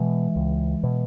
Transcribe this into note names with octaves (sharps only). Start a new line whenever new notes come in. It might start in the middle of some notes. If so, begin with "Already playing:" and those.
Already playing: B2 E3 G#3
C#2
B2